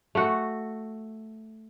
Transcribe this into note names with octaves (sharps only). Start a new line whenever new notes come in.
A3 F#4